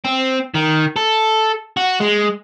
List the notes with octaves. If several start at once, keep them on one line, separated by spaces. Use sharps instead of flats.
C4
D#3
A4
F#4
G#3